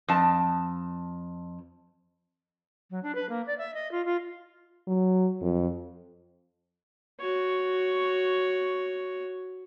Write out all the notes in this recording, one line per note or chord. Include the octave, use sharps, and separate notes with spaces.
F2 A5
F#3
D4
B4
A#3
D5
E5
D#5
F4
F4
F#3
F2
F#4 C#5